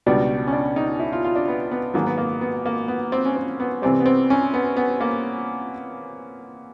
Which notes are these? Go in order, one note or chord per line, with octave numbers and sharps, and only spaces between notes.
C#2 B2 G3 D4
C#4
D4
D#4
E4
F4
F4
D4
B3
B3
G#2 D#3 F#3 A#3
B3
A#3
B3
A#3
B3
C4
C#4
C4
B3
C2 C3 E3 G3 C4
B3
C4
C#4
B3
B3
A#3